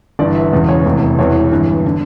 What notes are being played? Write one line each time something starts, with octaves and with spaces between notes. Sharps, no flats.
G1 G2 E3 D5
E5
E1 E2 C#3 E3
C#5
F1 E2 E3
E1 E2 E3 C#5
G1 G2 E3
D3